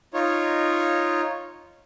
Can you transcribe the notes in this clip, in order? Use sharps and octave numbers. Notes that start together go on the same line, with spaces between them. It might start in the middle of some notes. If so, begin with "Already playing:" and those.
D#4 F4 C#5